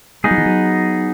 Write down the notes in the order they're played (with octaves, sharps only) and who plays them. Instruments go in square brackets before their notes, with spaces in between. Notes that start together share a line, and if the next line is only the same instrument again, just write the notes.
[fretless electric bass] G#3 [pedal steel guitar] B3 D#4 G#4
[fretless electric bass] F#3
E3
F#3